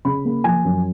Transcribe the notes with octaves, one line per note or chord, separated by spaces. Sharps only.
C#3 B5
A#3
F3 G#5
F#2